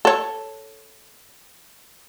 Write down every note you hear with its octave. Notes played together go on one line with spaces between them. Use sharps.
A4 C#5